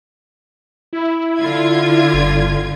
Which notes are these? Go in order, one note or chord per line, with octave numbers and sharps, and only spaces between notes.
E4
D3 F4 G#6
G1